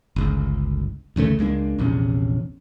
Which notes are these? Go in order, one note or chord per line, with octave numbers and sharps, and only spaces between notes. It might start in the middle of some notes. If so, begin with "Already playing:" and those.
G1 C#2
A1 D2 C#3 A3
C#2 G#3 A#3 D4
A#1 E2 C3 C#4